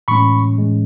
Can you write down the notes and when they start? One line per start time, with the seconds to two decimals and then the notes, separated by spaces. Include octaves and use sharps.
0.08 A2 E3 G#3 C#4 B5 C#6
0.58 A2 E3 G#3 C#4